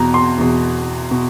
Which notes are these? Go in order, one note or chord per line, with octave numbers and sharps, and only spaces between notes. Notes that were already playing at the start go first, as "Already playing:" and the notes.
Already playing: E2 B2 A#5
C6
E2 B2
B2